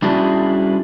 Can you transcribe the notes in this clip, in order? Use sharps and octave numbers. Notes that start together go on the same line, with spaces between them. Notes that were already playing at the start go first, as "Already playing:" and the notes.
G3 C#4 D4 E4 F#4 G#4